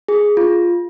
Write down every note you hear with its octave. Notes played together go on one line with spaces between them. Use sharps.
G#4
F4